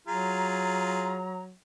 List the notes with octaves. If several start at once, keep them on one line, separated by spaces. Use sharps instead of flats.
F#3 F4 G#4 A#5